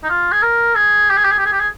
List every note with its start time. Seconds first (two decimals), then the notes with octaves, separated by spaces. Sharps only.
0.04 D#4
0.09 F4
0.32 G#4
0.43 A#4
0.76 G#4
1.10 G4
1.17 G#4
1.25 G4
1.32 G#4
1.38 G4
1.46 G#4
1.52 G4
1.60 G#4